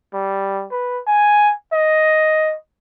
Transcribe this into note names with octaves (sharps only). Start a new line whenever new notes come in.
G3
B4
G#5
D#5